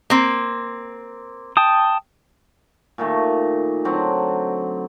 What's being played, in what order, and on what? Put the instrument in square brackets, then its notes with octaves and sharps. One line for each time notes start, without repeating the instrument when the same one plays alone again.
[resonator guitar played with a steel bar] A#3 C4
[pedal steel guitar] G5 A5 D#6
[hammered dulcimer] A#2 D#3 A3
D3 F#3 C4